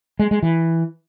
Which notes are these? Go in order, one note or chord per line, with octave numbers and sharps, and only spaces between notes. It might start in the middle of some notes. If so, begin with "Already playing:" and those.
G#3
G#3
E3